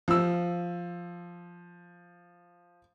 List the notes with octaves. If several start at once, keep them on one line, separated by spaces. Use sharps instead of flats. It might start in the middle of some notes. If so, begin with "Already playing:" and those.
F3 E6